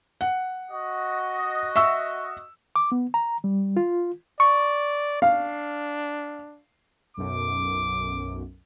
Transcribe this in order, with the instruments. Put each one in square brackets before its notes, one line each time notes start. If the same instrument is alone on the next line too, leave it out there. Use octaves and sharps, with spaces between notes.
[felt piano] F#5
[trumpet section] F#4 D#5
[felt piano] E5 C#6 E6
[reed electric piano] D6
B3
A#5
G3
F4
[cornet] D5 [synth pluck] C#6
[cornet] D4 [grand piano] F5
[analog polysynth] B1 F#2 [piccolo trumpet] D6